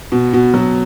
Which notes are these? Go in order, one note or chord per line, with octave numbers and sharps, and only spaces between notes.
B2
B2
F#3